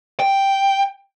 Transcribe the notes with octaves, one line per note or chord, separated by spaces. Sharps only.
G5